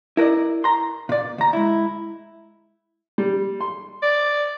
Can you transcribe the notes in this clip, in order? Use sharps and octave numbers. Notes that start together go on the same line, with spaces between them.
E4 A#4 B4 D5 D#5
A#5 C6
A#2 D5
D2 A#5
G#3 E4
G3
C6
D5